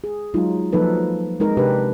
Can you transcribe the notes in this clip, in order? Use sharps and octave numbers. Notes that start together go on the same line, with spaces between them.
G#4
F#3 G#3 D#4 F4
F3 F#3 A#3 D#4 A4 B4
G#3 C4 D#4 A#4
C3 D4 G4 B4